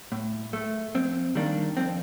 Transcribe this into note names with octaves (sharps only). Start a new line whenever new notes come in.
A2
A3
F2 C4
D#3 G3 A#3 D4
F2 C4